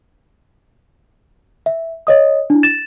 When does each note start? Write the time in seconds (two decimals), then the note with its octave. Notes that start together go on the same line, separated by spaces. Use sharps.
1.66 E5
2.07 C#5 D#5 D#6
2.50 D4 E4
2.63 A6 E7